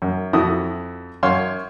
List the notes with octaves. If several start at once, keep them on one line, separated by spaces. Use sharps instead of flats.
F#2
F2 E4 F#4 D#6
F#2 C#5 F5 C6